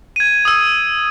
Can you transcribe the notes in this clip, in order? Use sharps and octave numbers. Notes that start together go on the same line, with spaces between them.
G#6 D#7
D#6 E6